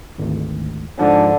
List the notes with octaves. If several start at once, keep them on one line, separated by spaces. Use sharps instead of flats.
G#1 D2
G#2 D3 F3 D4